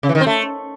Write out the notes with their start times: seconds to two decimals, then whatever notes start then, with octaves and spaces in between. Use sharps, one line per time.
0.03 C#3
0.09 E3
0.15 D#3
0.21 C4
0.27 A3